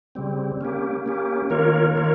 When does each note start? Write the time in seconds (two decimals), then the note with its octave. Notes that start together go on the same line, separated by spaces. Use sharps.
0.15 C#3 G3 C4
0.61 A#3 C#4 G4
1.06 A#3 C#4 G4
1.50 D#3 A#3 F4 A#4 C#5
1.95 D#3 A#3 F4 A#4 C#5